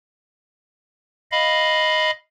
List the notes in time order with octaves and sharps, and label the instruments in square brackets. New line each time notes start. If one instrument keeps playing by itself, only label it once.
[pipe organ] D#5 F5 B5